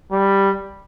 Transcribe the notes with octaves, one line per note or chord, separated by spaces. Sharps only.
G3